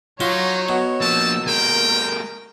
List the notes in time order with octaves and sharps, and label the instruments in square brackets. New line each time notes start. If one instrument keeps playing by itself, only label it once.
[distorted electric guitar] F#3 F#4 [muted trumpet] D#4 [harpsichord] F4 [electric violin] C#5 C#6
[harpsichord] B2 [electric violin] C#5
[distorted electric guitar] F3 A#3 [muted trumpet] A5 [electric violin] E6
[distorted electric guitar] G#3 A#3 [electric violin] A#4 [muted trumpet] G5